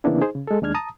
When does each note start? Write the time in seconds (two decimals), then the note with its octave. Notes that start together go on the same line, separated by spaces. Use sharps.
0.04 C#3 E3 A#3 B3 D4 E4
0.21 D#4 G#4 C5
0.35 C#3
0.47 G#3 A4
0.62 D#2 G#3 D4 F6 G#6
0.75 A5 A#5 D#6